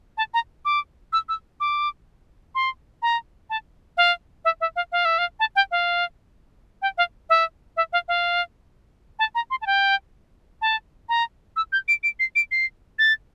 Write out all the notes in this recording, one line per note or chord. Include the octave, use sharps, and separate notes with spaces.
A5
A#5
D6
E6
E6
D6
C6
A#5
A5
F5
E5
E5
F5
F5
E5
F5
A5
G5
F5
G5
F5
E5
E5
F5
F5
A5
A#5
C6
A5
G5
A5
A#5
E6
G6
D7
D7
C7
D7
C7
A6